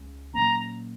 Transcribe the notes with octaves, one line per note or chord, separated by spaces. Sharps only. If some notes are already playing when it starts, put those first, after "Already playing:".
Already playing: C#2 C#3
A#2 F#3 A#3 C#4 A#5